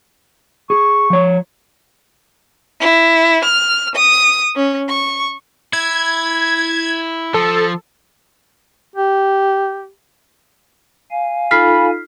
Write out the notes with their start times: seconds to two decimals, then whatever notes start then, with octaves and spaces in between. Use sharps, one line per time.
0.70 G#4 C#6
1.10 F3 C#5
2.81 E4
3.45 F6
3.96 D#6
4.56 C#4
4.89 C#6
5.73 E4 G#6
7.34 F3 A4
8.96 G4
11.11 F5 G#5
11.51 D#4 F4 A4 B5 F6 B6 C7